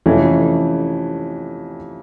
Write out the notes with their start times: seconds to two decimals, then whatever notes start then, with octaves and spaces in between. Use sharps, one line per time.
0.06 F2 C3 E3 A3 C#4